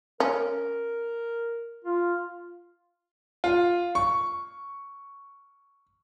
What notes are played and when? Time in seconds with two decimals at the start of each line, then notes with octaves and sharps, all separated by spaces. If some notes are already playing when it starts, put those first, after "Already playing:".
0.20 C#4 A#4
1.84 F4
3.44 F4
3.95 C#6